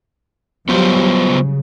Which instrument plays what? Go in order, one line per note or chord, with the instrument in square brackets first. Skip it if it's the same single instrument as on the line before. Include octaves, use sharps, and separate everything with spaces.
[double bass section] F#3 G3 [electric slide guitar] B3 F4 C5
[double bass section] C#3